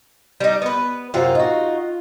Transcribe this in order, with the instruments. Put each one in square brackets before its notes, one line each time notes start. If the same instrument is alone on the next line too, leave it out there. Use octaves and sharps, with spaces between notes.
[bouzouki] G3 D#4
B3 B4
[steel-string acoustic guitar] F#2 C3 F#3 [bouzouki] F4
[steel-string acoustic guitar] D#4 F#4